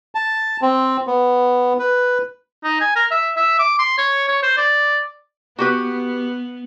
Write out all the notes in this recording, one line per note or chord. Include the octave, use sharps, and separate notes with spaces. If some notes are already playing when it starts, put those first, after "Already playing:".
A5
C4
B3
B4
D#4
G#5
A#4
E5
E5
D6
C6
C#5
C#5
C5
D5
B3 F#4 G4 B4